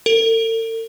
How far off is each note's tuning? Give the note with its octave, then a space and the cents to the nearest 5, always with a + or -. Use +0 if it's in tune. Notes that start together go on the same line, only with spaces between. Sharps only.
A4 +45